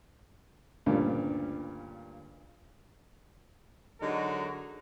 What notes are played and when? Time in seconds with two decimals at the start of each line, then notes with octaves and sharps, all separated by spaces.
0.86 D2 G2 A#2 C#3 G3
4.01 D3 F#3 G#3 D#4 F#4 A#4